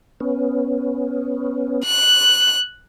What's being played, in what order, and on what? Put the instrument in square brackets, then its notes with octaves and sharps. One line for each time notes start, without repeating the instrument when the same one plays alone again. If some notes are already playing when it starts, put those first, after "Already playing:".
[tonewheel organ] B3 C#4
[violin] F#6